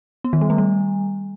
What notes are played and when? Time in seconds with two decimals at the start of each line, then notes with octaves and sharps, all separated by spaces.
0.24 B3
0.33 D#3
0.41 G3
0.50 A3
0.58 G3